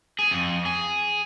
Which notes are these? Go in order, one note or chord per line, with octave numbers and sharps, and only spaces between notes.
G#4
F2
G#4